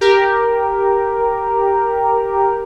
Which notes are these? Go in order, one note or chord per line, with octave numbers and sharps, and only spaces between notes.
G4 A#4